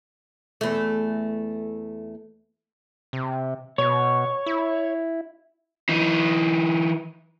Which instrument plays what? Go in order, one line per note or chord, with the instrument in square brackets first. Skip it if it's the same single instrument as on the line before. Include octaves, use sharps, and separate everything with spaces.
[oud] E2 A3
[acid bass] C3
[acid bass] B2 [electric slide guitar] C#5
[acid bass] E4
[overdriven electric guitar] E3 D#4